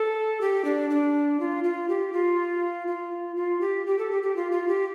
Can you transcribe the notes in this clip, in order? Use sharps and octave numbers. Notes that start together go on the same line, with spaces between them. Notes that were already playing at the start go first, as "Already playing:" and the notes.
Already playing: A4
G4
D4
D4
F4
F4
G4
F4
F4
F4
G4
G4
A4
G4
G4
F4
F4
G4